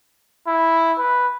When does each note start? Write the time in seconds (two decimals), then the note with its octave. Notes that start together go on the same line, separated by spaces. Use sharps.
0.47 E4
0.98 B4